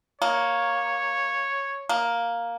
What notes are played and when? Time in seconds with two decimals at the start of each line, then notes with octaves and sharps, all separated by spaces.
0.22 A#3 C#5
1.89 A#3